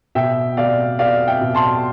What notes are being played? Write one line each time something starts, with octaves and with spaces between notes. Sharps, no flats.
B2 E5 G5
B2 D5 F5
B3 D5 F5
E5 G5
B2
A5 C6